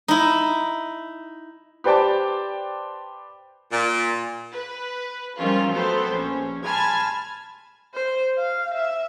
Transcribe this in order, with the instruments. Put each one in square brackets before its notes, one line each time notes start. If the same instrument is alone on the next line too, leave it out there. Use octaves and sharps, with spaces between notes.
[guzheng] D#4 E4
[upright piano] G4 B4 C5 D5 G5 A5
[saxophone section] A#2
[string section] B4
D#3 F3 G3 C4 C#4 F4
F#3 A3 B3 C4 A4 C5
A#1 C#4
G#5 A5 B5 C6 F6 G#6
[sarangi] C5
F5
E5